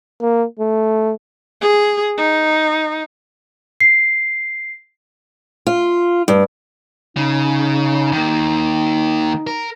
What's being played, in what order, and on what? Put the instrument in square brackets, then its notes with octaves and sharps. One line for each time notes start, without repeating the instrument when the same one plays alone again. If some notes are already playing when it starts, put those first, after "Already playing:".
[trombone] A#3
A3
[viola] G#4
D#4
[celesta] C7
[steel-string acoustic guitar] F4
G2
[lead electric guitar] C#3 [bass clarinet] D#4
[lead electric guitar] D#3 A#3
A#4